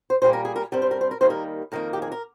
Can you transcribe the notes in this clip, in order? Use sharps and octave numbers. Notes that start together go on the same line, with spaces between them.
C5
A#2 G3 A#3 C5
A#4
G#4
A#4
G2 G3 C4 A#4
C5
A#4
C5
A#4
D#2 D#3 G3 A#3 C5
A#4
F2 D#3 A#3 A#4
G4
G#4
A#4